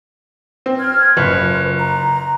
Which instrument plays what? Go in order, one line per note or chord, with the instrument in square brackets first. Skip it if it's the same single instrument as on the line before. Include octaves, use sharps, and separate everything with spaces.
[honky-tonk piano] C4
[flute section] F6 G#6
[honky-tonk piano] F#1 [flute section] F4 B4
[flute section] A#5